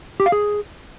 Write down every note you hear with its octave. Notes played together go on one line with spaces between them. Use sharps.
G4
F5
G#4